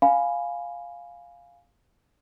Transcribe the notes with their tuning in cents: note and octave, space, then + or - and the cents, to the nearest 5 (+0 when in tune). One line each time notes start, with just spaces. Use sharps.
F5 +5 G#5 +0 B5 +0